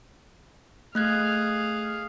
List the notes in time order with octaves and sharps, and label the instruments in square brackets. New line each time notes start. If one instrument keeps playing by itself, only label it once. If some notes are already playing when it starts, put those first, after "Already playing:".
[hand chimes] A3 F#6 G#6 [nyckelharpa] G#4 F5